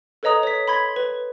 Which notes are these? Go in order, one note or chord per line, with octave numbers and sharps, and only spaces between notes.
A4 B4 C#5 D#5 A#5 D#6
C#5 B6
B5 C6 G#6 B6
B4